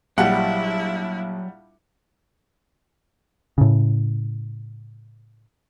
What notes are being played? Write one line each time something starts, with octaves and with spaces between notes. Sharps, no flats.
A#1 F#3 G3 E4 F#5
A2 C#3